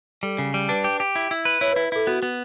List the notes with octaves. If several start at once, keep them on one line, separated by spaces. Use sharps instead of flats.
G3 A4
C#3
G3
D4 B4
G4
G4
E4
E4
B4
E4 C#5
B4
E4
B4
E4 A4
B3 F#4
B3